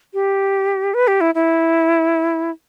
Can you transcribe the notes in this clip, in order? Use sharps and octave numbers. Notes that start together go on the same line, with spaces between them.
G4
B4
G4
E4
E4